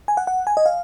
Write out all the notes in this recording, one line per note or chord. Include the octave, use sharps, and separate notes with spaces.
G#5
F#5
F#5
G#5
D#5
F5